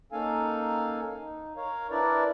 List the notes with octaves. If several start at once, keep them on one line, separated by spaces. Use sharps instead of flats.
A#3 C#4 D#4 A4 F5 G#5
D#4
A#4 C#5 F5
D4 E4 A#4 B4 D5